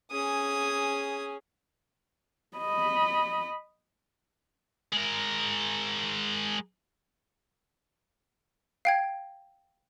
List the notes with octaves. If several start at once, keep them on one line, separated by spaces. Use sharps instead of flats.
C#4 G#4 G#5 D#6
D#5 B5
G#3 A#4
F5 G5 G#6